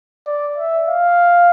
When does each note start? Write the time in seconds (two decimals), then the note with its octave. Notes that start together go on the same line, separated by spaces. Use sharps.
0.26 D5
0.58 E5
0.89 F5